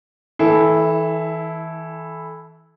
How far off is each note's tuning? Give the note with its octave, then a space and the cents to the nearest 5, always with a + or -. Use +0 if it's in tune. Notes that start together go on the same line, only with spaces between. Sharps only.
E3 -30 E4 +0 A4 -25